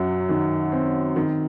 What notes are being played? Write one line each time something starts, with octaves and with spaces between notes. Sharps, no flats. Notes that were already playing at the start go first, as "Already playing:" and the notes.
Already playing: F#2 F#3
D#3
C4
D#3